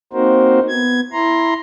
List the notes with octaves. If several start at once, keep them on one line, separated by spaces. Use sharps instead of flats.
A#3 C4 D#4 F#4 A#4 C5
B3 G#6
E4 A#5 C6